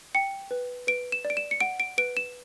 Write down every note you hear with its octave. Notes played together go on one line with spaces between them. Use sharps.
G5 C#7
B4
B4 D7
E7
D5
D7
E7
C#7
F#5 D7
D7
B4 D7
E7